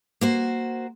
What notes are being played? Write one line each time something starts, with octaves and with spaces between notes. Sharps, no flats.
A#3 F#4 C5